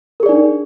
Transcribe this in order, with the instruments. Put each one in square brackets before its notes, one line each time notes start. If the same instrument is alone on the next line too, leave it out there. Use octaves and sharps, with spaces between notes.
[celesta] A#4
G#4
D5
D#4
D4